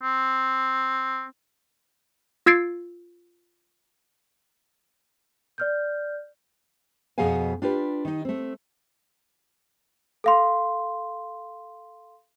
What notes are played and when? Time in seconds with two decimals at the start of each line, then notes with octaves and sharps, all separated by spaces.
0.02 C4
2.46 F4 E6 G#6 A6 C7 D7
5.58 D5 F6 G6
7.18 F2 B2 G#4 F5 F#5 G#5
7.62 D4 F4 G4 B4
8.05 D#3 D#4
8.25 A3 C4
10.24 A4 F5 C6